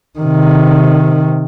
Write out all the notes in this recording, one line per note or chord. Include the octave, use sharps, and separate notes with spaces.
C3 D#3